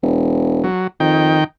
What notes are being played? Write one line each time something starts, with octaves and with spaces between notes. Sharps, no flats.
E1
F#3
F2 D#3 G5